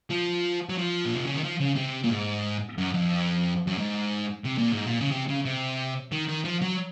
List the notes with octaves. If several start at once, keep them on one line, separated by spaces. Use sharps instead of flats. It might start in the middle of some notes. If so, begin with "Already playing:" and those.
F3
F#3
F3
A#2
C3
C#3
D#3
F3
C#3
C3
A#2
G#2
F#2
F2
F#2
G#2
C3
A#2
G#2
A#2
C#3
C3
C#3
C3
D#3
D#3
F3
F#3